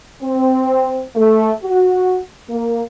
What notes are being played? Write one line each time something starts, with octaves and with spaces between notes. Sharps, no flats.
C4
A3
F#4
A#3